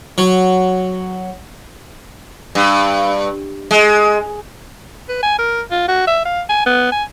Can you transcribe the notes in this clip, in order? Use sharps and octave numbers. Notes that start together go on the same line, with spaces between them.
F#3
G2
G#3
B4
G#5
A#4
F4
F#4
E5
F5
G#5
B3
G#5